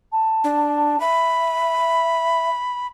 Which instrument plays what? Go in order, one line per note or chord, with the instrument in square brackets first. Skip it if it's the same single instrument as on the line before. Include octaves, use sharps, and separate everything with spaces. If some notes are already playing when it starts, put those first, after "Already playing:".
[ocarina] A5
[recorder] D4
[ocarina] E5 [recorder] B5